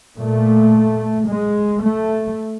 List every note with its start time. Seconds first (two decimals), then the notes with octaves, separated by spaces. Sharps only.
0.18 A#2 A3
1.29 G#3
1.83 A3